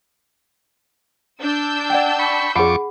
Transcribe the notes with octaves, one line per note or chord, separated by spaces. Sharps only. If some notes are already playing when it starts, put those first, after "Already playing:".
D4 E6 G6
D5 F#5 G5
B5 C#6
F2 G#4 F#5 B5 C#6 D6